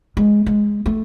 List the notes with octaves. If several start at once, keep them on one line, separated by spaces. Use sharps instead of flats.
G#3
G#3
A3